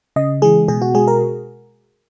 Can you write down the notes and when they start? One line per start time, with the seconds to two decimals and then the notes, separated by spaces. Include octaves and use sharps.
0.16 C#3 D#5
0.42 E3 G#3 G#4
0.68 B2 G#4
0.82 F#4
0.94 G#3 G#4
1.08 A#4